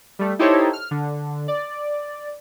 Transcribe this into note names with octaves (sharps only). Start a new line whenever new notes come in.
G3 A3
D#4 E4 G4 A4 C5 C#5
F6
D3
D5